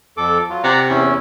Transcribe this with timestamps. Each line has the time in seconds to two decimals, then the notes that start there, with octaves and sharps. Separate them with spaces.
0.17 F2 A4 D6
0.50 F#3 F4
0.64 C3 D5 F#5 A#5
0.89 E2 C#4 E4